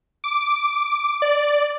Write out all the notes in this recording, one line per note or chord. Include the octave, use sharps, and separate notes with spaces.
D6
D5